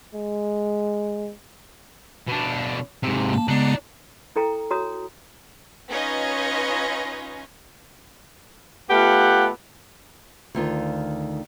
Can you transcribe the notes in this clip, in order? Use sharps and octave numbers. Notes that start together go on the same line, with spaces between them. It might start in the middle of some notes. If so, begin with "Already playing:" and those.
G#3
B2 D4
G#2 C3
A#3 A5
C#3 G#3 B3 D4 D#4
E4 A4 G5 A#5
F#4 C#5 A#5 D#6
C#4 D#4 F4 B4 C#5 D#5
A3 B3 F4 G4 F#5
D2 D#3 F4